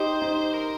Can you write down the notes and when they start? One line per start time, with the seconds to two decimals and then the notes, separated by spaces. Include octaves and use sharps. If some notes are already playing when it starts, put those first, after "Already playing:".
Already playing: D#4 G4 C5
0.22 D#4
0.54 A#4